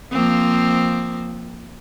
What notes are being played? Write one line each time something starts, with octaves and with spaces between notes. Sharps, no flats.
F3 A#3 C4